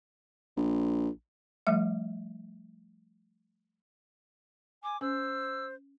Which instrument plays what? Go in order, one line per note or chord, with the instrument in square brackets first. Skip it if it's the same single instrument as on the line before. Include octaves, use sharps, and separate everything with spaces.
[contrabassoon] A#1
[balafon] F3 G3 A3 E5
[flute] G#5 [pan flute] D6
[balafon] C#4 [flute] C5 [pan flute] E6